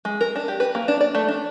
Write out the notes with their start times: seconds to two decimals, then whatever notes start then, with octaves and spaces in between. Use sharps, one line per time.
0.05 G#3
0.21 A#4
0.36 D4
0.48 G4
0.60 B4
0.75 A#3
0.88 D4
1.01 D5
1.15 A3
1.28 D4